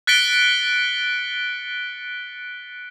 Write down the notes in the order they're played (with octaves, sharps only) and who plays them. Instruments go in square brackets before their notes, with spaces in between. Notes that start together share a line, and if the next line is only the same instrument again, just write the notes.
[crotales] F#6 A6 B6 C#7 D7 G7